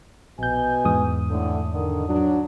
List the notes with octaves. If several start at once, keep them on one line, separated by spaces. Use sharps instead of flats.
A#1 B2 G#5 G6
E2 G#2 D#6
A2 D3
D3 D#3
F#3 D4